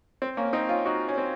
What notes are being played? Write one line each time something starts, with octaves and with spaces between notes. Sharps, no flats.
C4
A#3 C#4
C4 D#4
C#4 F4
D#4 F#4
C#4
C4